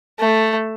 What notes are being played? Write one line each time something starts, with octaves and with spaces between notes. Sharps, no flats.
A3